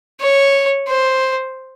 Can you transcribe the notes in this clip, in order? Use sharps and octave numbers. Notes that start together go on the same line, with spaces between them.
C#5
C5